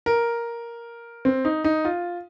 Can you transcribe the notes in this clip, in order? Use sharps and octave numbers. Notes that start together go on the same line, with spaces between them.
A#4
C4
D#4
D#4
F4